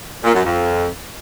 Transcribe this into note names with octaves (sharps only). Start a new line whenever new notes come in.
A#2
F#2
F2